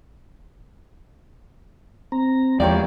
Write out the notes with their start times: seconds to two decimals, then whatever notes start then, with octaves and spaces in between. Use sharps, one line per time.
2.12 C4 A#5
2.60 E2 F3 G#3 A#3 G4 C#5 D5 G5